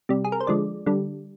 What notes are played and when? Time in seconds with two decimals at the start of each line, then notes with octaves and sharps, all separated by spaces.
0.09 C3 G3
0.25 G#4
0.32 A#4
0.40 C5
0.47 D3 F3 G#3 D5
0.86 D3 G3